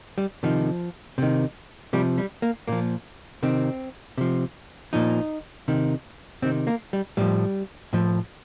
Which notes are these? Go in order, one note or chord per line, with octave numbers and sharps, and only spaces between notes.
G3
C3 D#3 F3
C3 D#3
C3 F3 G3
G3
A#3
A#2 F3 A#3
C3 D#3 C4
C3 F3
A#2 F3 D#4
C3 D#3
C3 D#3 C4
A#3
G3
A2 F3 G3
A2 F3